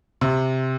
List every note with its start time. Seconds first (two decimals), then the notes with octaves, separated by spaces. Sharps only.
0.21 C3